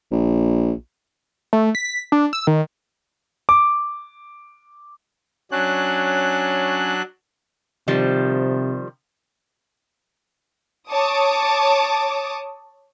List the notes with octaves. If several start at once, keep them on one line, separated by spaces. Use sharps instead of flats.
A#1
A3
B6
D4
E6
D#3
D6
F#3 C#4 D4 C#5 F#6
C3 D#3 F3 G3
C#5 A5 D6 D#6